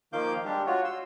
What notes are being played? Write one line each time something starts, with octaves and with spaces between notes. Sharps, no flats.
D#3 F3 A#3 F5 D6 G6
G3 G#3 D4 G4
F4 F#4 C#5
C6 E6